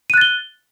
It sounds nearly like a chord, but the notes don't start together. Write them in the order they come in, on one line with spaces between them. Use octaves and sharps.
D#7 F#6 A6 G7